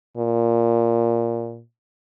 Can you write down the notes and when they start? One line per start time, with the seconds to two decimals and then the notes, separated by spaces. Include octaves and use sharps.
0.18 A#2